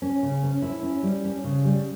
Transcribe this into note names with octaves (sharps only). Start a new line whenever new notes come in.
C#4
C#3
C#4
E4
C#4
G3
C#4
C#3
G3